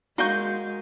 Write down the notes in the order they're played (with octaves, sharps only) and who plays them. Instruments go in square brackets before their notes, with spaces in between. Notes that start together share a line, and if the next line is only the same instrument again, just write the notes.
[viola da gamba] G#3 A#4 [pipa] A#3 C#6 [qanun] F#4 D#5 [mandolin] C6 G6